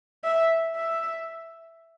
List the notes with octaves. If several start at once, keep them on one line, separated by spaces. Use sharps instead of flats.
E5
E5